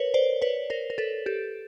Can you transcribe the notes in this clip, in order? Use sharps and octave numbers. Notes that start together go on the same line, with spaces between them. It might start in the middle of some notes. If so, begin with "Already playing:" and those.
Already playing: A#4 B4 C#5
C5 D5
B4 C#5
A#4 C5
A#4
A4 B4
G4 A4